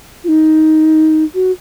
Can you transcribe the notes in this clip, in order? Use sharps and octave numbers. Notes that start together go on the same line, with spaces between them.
F4
D#4
F#4